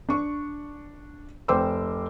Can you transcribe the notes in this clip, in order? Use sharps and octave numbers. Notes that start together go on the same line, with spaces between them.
D4 C#6
F1 C5 G5 C6 D6 E6